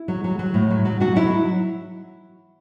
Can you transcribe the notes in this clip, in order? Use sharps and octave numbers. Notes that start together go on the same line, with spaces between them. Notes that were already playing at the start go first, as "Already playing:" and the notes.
Already playing: E4
F#3
F#3
F#3
A2
F#3
F#3
F#3 F#4
F#3 E4